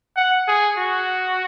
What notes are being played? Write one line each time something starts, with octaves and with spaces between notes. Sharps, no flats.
F#5
G#4
F#4